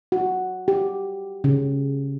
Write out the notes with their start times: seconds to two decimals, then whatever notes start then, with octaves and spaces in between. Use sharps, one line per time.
0.12 F#4
0.68 G4
1.44 C#3